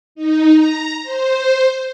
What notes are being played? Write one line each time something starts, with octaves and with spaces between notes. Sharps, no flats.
D#4
A#5
C5